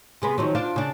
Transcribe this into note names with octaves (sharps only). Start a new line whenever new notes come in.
C3 G#3 B3
D#3 F3 F#3
D4 F4 C5
C#3 D4